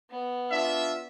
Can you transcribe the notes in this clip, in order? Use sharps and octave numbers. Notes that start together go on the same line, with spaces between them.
B3
D4 F4 E5